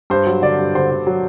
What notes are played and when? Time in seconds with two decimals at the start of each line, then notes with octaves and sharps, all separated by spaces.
0.10 G2 C5
0.27 F#3
0.42 D3 D5
0.59 G2
0.75 D3 C5
0.91 D3
1.07 F#3